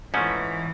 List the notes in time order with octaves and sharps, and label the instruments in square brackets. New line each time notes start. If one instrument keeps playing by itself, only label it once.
[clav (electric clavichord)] G#2 F3 A3 C#4 [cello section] E3